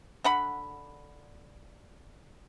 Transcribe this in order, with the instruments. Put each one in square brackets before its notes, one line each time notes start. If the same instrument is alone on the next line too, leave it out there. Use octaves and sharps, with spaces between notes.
[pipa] D3 F#5 B5